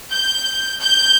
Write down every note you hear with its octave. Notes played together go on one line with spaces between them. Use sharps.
G6
G6